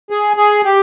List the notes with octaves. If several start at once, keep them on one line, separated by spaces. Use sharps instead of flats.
G#4
G#4
G4